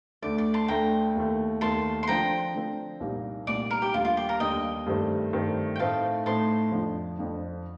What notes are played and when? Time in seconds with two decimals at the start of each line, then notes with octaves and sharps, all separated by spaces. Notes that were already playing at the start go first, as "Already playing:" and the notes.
0.22 D2 D3 A3 D5
0.38 D5
0.54 A5 C6
0.68 D2 D3 A3 G5 A#5
1.15 D#2 D#3 A3
1.61 D#2 D#3 A3 A5 C6
2.03 C6
2.08 D3 F3 C4 G5 A#5
2.55 D3 F3 C4
3.00 C2 A#2 G3 A#3 D#4
3.47 C2 A#2 G3 A#3 D#4 D5
3.71 A#4
3.82 G4
3.93 D#2 D3 G3 F4
4.05 F4
4.17 G4
4.29 A#4
4.40 D#2 D3 G3 D#5 G5
4.86 G2 D#3 A3 C4
5.33 G2 D#3 A3 C4
5.76 G5
5.79 A2 A3 C4 D#4 F5 A5
6.26 A2 A3 C4 D#4 A5 C6
6.72 F2 D3 F3
7.19 F2 D3 F3